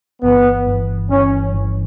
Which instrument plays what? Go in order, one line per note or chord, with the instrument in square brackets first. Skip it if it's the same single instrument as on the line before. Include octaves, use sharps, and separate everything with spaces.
[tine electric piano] G1 G2 E3 [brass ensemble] B3
[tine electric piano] G1 G2 E3
[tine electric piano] G1 G2 E3 [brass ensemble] C#4
[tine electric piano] G1 G2 E3